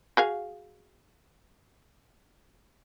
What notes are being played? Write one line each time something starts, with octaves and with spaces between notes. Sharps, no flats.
F#4 G#4 F5